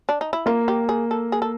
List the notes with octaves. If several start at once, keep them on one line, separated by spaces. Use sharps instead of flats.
D4
D#4
E4
A#3 F4
G4
G#4
A4
G#4
A4